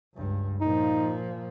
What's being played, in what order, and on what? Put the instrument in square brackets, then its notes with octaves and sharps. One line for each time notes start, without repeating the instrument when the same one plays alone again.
[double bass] C#2 G2
[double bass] A#2 F3 [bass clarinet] D#4